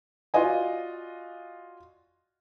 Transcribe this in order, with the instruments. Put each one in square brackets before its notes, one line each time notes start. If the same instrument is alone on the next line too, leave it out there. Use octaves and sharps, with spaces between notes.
[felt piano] F4 F#4 D5 D#5 G#5